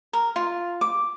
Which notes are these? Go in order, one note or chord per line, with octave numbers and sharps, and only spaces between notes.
A#4
F4
D6